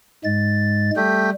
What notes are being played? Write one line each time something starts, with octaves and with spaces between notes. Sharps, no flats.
G#2 G#3 A6
G3 A3 G4